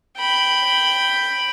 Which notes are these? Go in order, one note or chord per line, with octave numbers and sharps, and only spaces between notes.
G5 B5